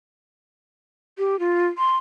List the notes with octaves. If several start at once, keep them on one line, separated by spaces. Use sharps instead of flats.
G4
F4
C6